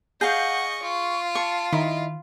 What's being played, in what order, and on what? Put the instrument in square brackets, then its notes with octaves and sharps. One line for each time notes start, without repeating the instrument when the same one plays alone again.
[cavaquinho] G#4 F5 [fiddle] D#5 C#6 [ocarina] F#5 [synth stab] G6
[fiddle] F4 [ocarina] C#6
[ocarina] A5 [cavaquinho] C#6
[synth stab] D#3 [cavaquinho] E4 [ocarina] D#5